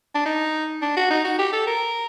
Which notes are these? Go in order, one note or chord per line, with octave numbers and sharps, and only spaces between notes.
D4
D#4
D4
F#4
D#4
F#4
G4
A4
A#4